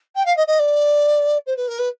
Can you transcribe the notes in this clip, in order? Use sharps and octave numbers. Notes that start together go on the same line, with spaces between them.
G5
F5
D#5
D#5
D5
C5
B4
A#4
B4